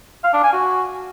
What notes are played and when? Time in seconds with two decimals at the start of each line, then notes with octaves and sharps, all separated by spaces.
0.24 F5
0.33 D4
0.43 G#5
0.53 F#4